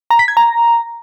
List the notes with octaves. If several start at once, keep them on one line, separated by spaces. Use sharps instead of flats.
A#5
B6
G#6
A#5